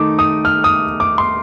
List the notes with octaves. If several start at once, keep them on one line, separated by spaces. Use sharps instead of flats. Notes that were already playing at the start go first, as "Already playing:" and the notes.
Already playing: D#3 A3 D#4 D6
D#6
F6
D#6
D6
C6